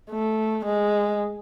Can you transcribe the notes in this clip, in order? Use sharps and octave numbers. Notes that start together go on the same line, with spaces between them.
A3
G#3